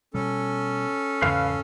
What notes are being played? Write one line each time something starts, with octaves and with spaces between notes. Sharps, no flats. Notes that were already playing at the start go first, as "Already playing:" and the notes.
B2 G3 C#4 A4
E2 G#2 C#3 B4 F5 F6